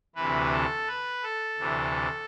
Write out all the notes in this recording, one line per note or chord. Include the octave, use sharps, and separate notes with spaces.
D2 C3 E3 B4
A4
B4
A4
D2 C3 E3